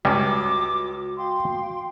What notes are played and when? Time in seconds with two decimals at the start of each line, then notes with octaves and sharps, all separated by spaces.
0.05 C#2 G3 C#4 F#4 D6
1.17 F5 G5 C6